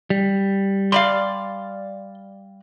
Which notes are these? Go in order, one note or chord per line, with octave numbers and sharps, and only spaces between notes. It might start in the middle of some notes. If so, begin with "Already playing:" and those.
G3
G3 D5 F5 C6